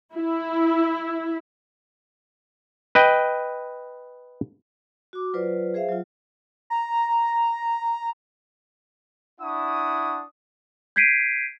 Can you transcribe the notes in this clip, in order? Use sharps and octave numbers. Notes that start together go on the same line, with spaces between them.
E4
B4 D#5 G5
F#4 D6
F#3 F4 B4 C5 D5
G#4 C5 E5 F5
F#3 F4
A#5
D4 E4 F#5 C#6 D#6
G6 G#6 B6 C7 D7 D#7